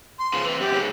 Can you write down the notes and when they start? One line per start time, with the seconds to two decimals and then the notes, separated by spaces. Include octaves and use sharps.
0.19 C6
0.33 C#3 F3
0.45 E3 C4
0.60 F#2 G4
0.73 G#2 C#3